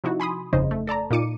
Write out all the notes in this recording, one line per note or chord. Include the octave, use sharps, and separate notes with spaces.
C3 F3 D#4 E4 F#4
G#5 B5 C6 D#6
G1 F2 C#3 D#4 C5 D#5
A3
A4 D5 A5 A#5
A#2 D#4 F4 D6 C#7 D#7